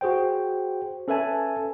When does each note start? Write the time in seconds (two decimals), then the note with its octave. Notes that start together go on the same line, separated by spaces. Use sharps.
0.01 F#4 G#4 C5 G5
1.08 C#4 A4 B4 E5 G#5 A5